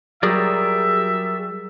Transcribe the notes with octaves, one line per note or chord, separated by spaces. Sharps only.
F#3 G3 G#4 A#4 D5 E5